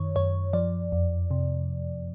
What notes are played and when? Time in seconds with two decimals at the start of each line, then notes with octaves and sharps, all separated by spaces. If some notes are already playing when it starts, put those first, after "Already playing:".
Already playing: F#2 D#3 C#5
0.16 F#2 C#5
0.53 F3 D5
0.92 F2
1.31 C3